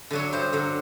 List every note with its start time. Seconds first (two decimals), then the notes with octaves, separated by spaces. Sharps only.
0.11 D3 F#3 C#5
0.32 G2 C5
0.53 D3 F#3